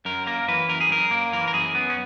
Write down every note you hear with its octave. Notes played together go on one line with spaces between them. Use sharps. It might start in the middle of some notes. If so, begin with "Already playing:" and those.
F#2 A#4
A#3 A#4
E3 B4
F#2 A#4
G#4
F#2 A#4
A#3
E3 A#4
A#4
F#2 G#4
B3
C#4